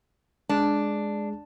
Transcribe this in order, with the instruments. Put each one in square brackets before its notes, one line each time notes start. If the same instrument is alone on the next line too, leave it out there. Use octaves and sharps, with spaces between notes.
[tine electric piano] G#3 G#4 [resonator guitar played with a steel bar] D4